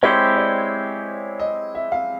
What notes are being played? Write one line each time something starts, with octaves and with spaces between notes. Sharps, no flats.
G#3 C4 E4 G4 C5 C#5
D5
D#5
E5
F5